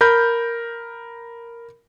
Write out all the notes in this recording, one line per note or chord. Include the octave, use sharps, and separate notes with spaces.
A#4 B5 G6